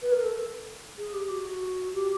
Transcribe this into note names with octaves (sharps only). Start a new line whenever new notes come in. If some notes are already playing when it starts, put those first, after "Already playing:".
B4
A#4
A4
G#4
G4
F#4
G4